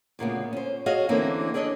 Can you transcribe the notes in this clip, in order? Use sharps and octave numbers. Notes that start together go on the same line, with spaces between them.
D2 A#2 C#3 B3
C#4 C5
F#4 G#4 C#5 D#5 F5
D3 E3 A#3 C4 C#4
D4 G#4 A4 C#5 D#5